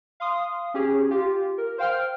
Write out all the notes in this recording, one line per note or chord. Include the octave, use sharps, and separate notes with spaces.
F5 C6 D#6
C#4 G4 G#4
F4 G4
A#4
C5 F5 G5 F6